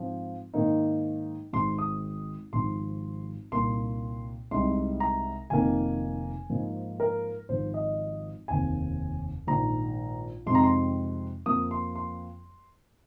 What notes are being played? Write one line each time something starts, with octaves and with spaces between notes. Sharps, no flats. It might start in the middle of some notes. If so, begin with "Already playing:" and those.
Already playing: G#2 F3 C4
G#2 D#3 A#3 D#4
G#1 G#2 G#3 C6
D#6
G#1 G#2 F3 G#3 C6
C2 A#2 A#3 D#4 C6
C2 C3 G#3 D#4 C6
A#5
F1 F2 D#3 A#3 D#4 G#5
G#2 F3 A#3 D#4
A#4
G#1 G#2 F3 C5
D#5
F1 D#2 D#3 C4 G#5
A#1 G#2 D#3 A#5
F2 C3 G#3 C4 D#4 C6
A#5
C6
F2 F3 A#3 D#6
C6
C6